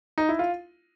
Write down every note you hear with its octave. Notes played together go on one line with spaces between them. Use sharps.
D#4
E4
F4